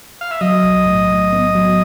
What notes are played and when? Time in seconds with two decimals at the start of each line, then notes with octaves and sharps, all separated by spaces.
0.21 F5
0.31 E5
0.41 F#3 D#5
0.64 B1
0.86 A2
1.09 A2
1.32 B3
1.55 F#3